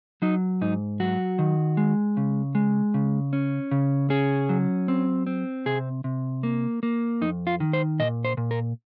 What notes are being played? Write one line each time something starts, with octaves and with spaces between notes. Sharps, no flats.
F#3 D#4
G#2 D#4
F#3 F#4
D#3
G#3
C#3
G#3
C#3
C#4
C#3
C#4 G#4
F#3
C4
C4
C3 G#4
C3
A#3
A#3
F2 D#4
F4
D#3
C5
A#2 D#5
C5
A#2
A#4